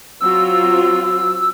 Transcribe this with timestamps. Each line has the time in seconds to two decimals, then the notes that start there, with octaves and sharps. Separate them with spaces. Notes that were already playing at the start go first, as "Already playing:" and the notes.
0.21 F#3 C4 F4 E6